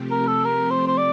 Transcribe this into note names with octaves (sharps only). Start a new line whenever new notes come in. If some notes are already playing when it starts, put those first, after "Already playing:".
Already playing: C3 F3 A3 C4 G4
A#4
A4
A#4
C5
C5
D5